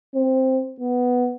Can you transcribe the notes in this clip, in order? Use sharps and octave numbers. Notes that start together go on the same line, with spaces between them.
C4
B3